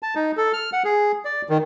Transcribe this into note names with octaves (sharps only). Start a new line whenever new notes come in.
A5
D#4
A4
F6
F#5
G#4
D5
D#3